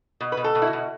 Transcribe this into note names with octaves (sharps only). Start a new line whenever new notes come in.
B2
B4
B2
A4
B2
E4
F#4
B2